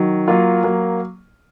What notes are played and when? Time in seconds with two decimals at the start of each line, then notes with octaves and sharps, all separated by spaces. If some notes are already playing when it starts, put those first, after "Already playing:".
Already playing: D#3 F#3
0.28 F#3 A#3 F4
0.64 F#3 A#3